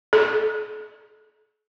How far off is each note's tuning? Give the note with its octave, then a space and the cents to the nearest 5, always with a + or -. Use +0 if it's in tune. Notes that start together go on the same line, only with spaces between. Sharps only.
A4 -45